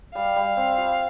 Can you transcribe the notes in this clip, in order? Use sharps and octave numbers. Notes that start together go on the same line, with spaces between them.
G3 F5
G3
C4
F4